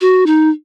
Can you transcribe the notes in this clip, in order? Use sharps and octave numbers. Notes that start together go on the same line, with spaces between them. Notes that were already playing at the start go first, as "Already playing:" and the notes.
F#4
D#4